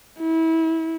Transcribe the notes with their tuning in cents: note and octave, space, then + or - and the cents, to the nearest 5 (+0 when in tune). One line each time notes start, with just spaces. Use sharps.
E4 -25